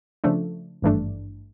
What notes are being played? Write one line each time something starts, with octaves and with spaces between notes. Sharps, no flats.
C#3 F3 A3 D4
G#1 G2 E3 A3 D4